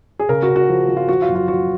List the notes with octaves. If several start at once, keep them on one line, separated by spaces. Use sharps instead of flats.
G#4
C#3 A#4
F#4
C#3
F#4
F3
F3
F4
F3 F#4
F4
F#2
F4
F3 F#4